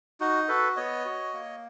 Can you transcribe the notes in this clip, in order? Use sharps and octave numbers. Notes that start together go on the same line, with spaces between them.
D#4 F#4
F#4 A4 B4
B3 C#5 D#5
F#4
A#3